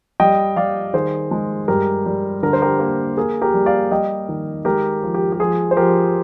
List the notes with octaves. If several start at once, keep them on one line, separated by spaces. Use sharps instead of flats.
G3 D#5 G5
G3 D5 F5
D#3 G#4 C5
G#3
G2 G4 A#4
G3
D3 A#4
C5
G4 A#4
A#3
A#3 G#4
G4 A#4
G3
D5 F5
G3 D#5 G5
D#3
G#3 G4 A#4
F3
G4
G4
F3 G#4
C5
F3 G4 A#4